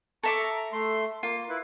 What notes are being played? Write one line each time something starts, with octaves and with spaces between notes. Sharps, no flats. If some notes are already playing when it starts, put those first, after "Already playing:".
A4 E5 A#5 C#6 D6
A#5
A3 C6
A#3 F4
E4 B4